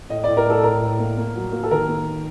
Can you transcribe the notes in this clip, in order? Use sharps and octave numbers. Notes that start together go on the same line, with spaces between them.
A2 D#5
A2 D5
A#4
A3 A4
A2 A#4
A2
A#3
A#3
F#3
A#3
A4
D#3 A#4
A#3